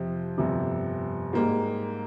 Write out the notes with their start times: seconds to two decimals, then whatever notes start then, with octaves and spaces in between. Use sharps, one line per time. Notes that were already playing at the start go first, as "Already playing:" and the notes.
Already playing: F2 C3 F3
0.38 G1 F2 C3
1.33 G#2 G3 A#3